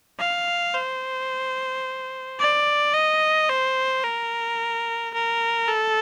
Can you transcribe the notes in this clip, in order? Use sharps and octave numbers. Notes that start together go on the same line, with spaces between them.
F5
C5
D5
D#5
C5
A#4
A#4
A4